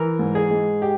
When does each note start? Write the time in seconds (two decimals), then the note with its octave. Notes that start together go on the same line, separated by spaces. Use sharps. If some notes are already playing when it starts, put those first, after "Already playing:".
Already playing: E3 A#4
0.19 G#2
0.35 G#4
0.50 G#3
0.82 G4